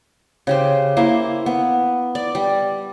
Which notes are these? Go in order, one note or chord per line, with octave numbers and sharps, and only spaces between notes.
C#3 G4 C5
A#3 E4 C5
B3
D5
G3